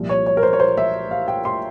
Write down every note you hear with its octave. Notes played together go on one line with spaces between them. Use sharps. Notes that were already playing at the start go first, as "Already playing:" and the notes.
Already playing: C2 A#2 F3
C#5
C#5
A#4
C5
C#5
C5
E5
F5
G5
C6